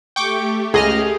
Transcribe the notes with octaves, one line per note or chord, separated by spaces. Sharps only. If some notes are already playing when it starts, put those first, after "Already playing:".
A3 G4 G5 C#6 D6
C#2 G#4 D#5 F6